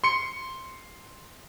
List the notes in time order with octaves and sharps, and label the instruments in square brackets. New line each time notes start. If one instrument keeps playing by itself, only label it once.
[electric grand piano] C6 C#7